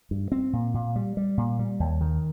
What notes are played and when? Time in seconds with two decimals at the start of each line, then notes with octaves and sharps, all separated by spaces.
0.11 G2
0.32 C4
0.53 A#2
0.74 A#2
0.96 G3
1.17 G3
1.37 A#2
1.59 G3
1.80 D#2
2.01 D#3